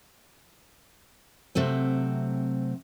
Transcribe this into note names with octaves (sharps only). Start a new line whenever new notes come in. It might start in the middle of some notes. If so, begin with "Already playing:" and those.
C3 F#3 A3 C4